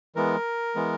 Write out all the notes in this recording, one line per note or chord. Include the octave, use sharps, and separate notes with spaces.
E3 G#3 B3 A#4
E3 G#3 B3